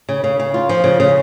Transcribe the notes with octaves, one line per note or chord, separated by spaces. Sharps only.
C#3
C#3
C#3
F4
F3
C#3
C#3